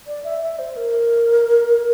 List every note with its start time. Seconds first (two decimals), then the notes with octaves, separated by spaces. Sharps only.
0.07 D5
0.24 E5
0.42 E5
0.59 C5
0.76 A#4